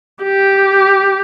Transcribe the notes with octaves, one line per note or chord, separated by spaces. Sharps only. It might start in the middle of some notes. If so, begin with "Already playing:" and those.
G4